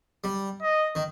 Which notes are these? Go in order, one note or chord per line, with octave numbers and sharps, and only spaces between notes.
G3
D#5
D#3